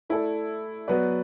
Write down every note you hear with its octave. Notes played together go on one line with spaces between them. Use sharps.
A3 E4 A4 D5
F#3 B3 F#4 B4 D5